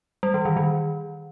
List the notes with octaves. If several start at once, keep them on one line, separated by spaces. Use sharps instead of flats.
G3
E3
D#3
D#3